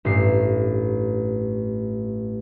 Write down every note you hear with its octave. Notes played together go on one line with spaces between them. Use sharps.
A1 G2 C7